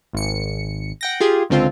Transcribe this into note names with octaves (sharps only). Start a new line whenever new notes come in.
G#1 C#7
F#5 G5 A#6
F4 G4 G#4
C#2 D3 C4 F4